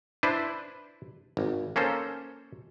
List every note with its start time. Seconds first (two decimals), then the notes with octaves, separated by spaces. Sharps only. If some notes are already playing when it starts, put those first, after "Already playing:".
0.23 D4 E4 B4 C5
1.37 G#1
1.76 A#3 C#4 A4 C5